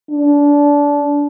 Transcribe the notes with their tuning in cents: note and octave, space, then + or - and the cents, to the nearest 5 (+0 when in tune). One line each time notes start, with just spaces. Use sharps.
D4 -25